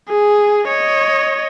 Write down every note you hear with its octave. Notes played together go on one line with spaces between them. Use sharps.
G#4
C#5 D#5